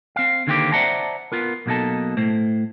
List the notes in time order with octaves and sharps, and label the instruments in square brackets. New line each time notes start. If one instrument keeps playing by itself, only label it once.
[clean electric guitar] C4 F5
D3 D#3 A#3 C4 F4 G4
C5 D5 E5 F#5 A5 A#5
B3 F4 A#4
B1 B2 A#3 D#4 A4 A5
A2 A3 C5